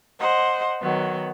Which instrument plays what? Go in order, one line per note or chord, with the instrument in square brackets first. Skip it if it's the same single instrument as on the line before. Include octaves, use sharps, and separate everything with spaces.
[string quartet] C5 D#5 F#5
D#3 F#3 B3